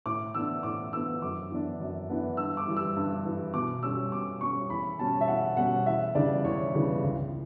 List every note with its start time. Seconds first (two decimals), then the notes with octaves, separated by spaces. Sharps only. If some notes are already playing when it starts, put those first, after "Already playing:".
0.06 A2 D6
0.35 E3 B3 D4 E6
0.63 A2 D6
0.92 E3 B3 D4 E6
1.22 F#2 D6
1.51 E3 B3 D4
1.80 F#2
2.09 E3 B3 D4
2.37 G2 E6
2.57 D6
2.67 E3 G3
2.77 E6
2.96 G2
3.25 E3 G3
3.54 B2 D6
3.83 G3 C#4 E6
4.12 B2 D6
4.41 G3 C#4 C#6
4.70 E2 B5
4.99 B2 G3 C#4 A5
5.21 E5
5.28 E2 F#5
5.57 B2 G3 C#4 F#5
5.86 E2 E5
6.15 C#3 E3 G3 D4 D5
6.44 E2 C#5
6.73 C#3 E3 G3 D4
7.03 C#2